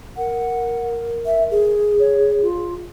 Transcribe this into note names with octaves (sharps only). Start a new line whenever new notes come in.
A#4 F#5
E5
G#4
C#5
F4